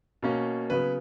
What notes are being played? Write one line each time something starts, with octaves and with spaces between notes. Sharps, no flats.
B2 A#3 C#4
C#3 F#3 B3 B4